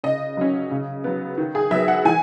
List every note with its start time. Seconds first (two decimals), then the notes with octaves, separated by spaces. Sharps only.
0.04 C#3 D#5
0.37 F#3 C#4
0.71 C#3
1.04 F#3 B3
1.37 D#3
1.55 G#4
1.71 F#3 B3 E5
1.88 F#5
2.05 E3 G#5